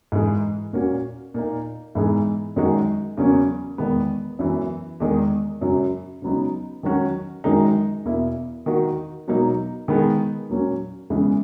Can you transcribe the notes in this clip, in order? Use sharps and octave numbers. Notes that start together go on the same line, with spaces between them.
G#2 E3 G#3
A#2 A#3 C#4 F#4
A#2 A#3 D#4
G#2 E3 B3 D#4 G#4
F#2 D#3 G#3 D#4 F#4
E2 C#3 F#3 A#3 C#4
E2 D#3 G#3 B3
F#2 E3 B3
E2 D#3 G#3
F#2 C#3 F#3
C#3 F#3 B3 D#4
D#3 F#3 C#4 F#4
F#2 D#3 G#3 D#4
E2 B2 A#3 E4
D#3 A#3 D#4 F#4
B2 F#3 A#3 D#4
D#3 G#3 B3 D#4 G#4
A#2 F#3 A#3 C#4
C#3 E3 G#3 B3